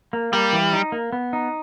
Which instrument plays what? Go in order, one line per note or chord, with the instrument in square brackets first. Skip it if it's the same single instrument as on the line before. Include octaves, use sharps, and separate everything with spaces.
[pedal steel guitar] A#3
[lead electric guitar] G3 [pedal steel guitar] A#3
[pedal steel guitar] E3
D#4
A#3
B3
D#4